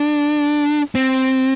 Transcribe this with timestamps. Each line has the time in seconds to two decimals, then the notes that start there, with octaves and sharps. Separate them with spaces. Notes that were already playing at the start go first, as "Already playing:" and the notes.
Already playing: D4
0.95 C4